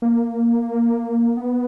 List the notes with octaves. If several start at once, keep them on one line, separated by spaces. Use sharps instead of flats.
A#3
B3